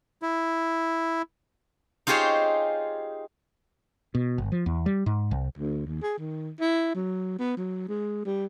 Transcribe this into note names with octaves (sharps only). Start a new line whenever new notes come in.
E4
D#4 F4 G4 G#4 C5 C#5
B2
G1
F3
E2
G3
G#2
C2
D2
D#2
G#4
D#3
E4
F#3
B3
F#3
G#3
G3